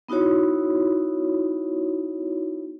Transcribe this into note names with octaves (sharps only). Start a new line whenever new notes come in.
B3 D#4 E4 F#4 C#5